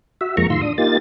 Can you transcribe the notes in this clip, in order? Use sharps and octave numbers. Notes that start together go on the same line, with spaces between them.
F#4 E5
F2 F3 G#3 A#3 A#5 C#6
A2 D#3 F4 C6 E6
D4 D#6
A#3 D#4 F4 G4 A6